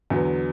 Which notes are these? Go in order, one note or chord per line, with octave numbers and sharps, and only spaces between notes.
E2 D3 F#3 B3